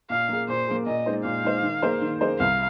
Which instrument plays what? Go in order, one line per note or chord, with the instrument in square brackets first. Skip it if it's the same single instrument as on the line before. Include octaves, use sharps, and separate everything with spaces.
[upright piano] A#2 [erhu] F5
[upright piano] A#3 G#4
[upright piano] A#2 [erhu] C5
[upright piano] A#3 G#4
[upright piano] A#2 [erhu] D#5
[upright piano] G#3 D#4 C5
[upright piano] A#2 [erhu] F5
[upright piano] G#3 D#4 C5
D#3
A#3 G#4 C5
D#3
A#3 G#4 C5
[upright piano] C2 [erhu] F5